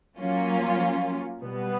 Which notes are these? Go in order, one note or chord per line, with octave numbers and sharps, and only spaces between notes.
F#3 A#3 C#4 F4
B2 G3 B3